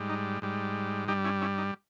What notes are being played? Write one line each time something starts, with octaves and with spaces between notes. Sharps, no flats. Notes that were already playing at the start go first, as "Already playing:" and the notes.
Already playing: G#2 G3
D#4
G#2 G3
G2 G3 D#4 G4
C#4 E4
C#4 E4
D#4